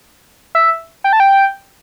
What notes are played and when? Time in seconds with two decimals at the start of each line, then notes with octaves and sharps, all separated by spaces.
0.55 E5
1.04 G5
1.13 A5
1.20 G5